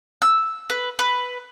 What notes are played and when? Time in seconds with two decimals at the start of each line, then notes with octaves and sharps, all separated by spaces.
0.22 E6
0.70 B4
0.99 B4